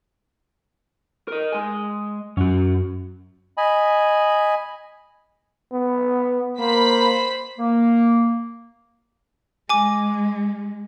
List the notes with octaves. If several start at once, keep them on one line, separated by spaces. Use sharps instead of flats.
A#4 D#5
G#3 G#5
F#2 C#4 F#4
D#5 G#5 B5
B3
A#3 C5 B5 B6
A#3
G#3 G#5 D6